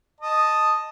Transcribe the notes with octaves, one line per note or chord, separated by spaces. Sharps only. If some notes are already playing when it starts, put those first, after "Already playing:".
D#5 A5